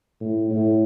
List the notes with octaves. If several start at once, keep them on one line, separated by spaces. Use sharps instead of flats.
A2
A2